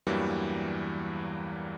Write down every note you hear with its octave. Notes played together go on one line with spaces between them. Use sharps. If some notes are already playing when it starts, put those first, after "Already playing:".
E2 G2 E3 F#3 G3 A#3